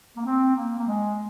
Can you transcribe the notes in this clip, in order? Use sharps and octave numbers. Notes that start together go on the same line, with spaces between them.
A#3
C4
A#3
A#3
G#3